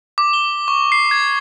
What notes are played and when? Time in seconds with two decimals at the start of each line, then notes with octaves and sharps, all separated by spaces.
0.18 D6
0.33 G7
0.68 C#6
0.92 C7
1.11 G#6